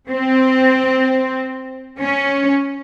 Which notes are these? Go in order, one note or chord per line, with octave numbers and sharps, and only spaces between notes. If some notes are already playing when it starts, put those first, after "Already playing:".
C4
C#4